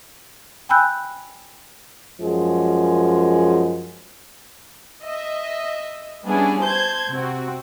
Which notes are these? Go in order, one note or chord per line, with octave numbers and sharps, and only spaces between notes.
G5 G#5 B5 E6 F#6 G6
F#2 F3 G#3 G#4
D#5 E5
G3 B3 C#4 D4 E4 G#4
C5 A5 G6 G#6
C3 C4 F#4